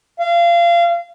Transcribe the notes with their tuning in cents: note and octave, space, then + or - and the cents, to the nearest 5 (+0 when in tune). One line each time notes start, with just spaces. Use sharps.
F5 -25